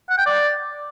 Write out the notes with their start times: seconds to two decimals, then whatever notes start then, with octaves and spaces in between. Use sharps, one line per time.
0.09 F#5
0.18 G5
0.26 D5